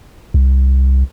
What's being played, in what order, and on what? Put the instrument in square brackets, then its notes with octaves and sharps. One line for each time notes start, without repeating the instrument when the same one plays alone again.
[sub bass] C2